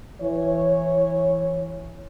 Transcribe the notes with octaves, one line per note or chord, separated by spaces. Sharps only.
E3 C#5